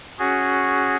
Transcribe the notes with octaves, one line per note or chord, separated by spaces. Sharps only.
C#4 F#4 G#4